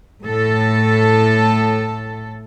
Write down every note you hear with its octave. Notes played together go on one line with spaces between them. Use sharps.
A2 A4